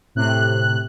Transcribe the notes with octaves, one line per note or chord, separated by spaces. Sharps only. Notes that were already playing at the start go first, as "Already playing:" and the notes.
A2 C3 F#6